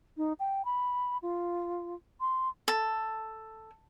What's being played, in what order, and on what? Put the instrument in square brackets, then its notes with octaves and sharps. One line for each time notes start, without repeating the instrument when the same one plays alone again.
[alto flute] D#4
G5
B5
F4
C6
[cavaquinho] A4